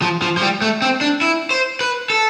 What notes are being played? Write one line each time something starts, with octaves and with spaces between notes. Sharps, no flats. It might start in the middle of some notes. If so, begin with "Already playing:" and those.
F3
F3
F3
G3
A3
C4
D4
E4
C5
B4
A4